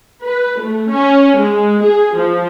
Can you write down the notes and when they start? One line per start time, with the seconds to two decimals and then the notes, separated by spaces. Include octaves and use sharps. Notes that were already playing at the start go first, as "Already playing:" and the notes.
0.24 B4
0.60 A3
0.91 C#4
1.39 G#3
1.84 G#4
2.17 F3